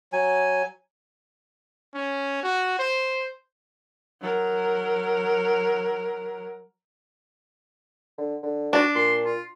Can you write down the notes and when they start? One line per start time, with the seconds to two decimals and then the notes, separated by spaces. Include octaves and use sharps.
0.13 F#3 G#5
1.94 C#4
2.43 F#4
2.79 C5
4.21 F#3 A#4
8.18 D3
8.43 D3
8.73 D4 F#4
8.95 A#2 C6
9.23 F4